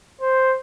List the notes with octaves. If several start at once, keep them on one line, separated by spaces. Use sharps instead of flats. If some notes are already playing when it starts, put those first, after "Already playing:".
C5